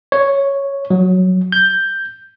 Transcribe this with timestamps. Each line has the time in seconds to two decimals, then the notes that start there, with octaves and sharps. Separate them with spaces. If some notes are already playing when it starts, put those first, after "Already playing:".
0.12 C#5
0.90 F#3
1.52 G6